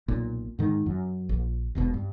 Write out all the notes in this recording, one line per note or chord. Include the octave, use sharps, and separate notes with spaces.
B1 A#2
G#2 D#3
F#2
A#1
E1 C2 B2
G2